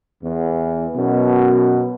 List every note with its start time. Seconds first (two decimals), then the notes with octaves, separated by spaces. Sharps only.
0.23 E2
0.96 F#2 B2